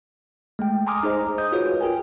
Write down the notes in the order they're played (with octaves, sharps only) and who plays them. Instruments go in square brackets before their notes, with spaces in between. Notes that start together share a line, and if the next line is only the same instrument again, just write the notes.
[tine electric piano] G#3 A3 G5
G#5 A#5 C6 D6 D#6 F6
D#4 G#4 C5 D#5 A#5
D#5 D#6 G6
F4 F#4 G#4 B4 C#5
F4 G#4 A#4 G5 G#5